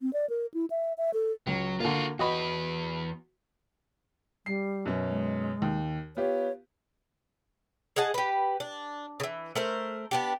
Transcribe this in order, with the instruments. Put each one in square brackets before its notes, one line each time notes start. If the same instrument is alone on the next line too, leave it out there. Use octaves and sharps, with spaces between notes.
[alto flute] C4
D5
A#4
E4
E5
E5
A4
[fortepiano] C#2 [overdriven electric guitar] F#3
[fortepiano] D3 A#3 [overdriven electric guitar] F4 F#4
[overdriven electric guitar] E2 B4 [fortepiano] F#4 D#5 B5
[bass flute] G3 [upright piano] C7
[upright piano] F#2 B2 C#4
[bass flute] G#3
[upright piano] D#2
[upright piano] B3 F4 G4 [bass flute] C#5
[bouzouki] G#4 D#5 F#5 A5
G4 B4
D4
C#3 E3
A3 A#4 C5
B3 D4 G4